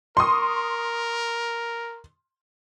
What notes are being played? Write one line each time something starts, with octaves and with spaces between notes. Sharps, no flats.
A#4 C6 C#6 D#6